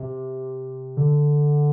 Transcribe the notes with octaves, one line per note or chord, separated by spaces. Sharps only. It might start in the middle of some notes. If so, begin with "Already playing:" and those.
Already playing: C3
D3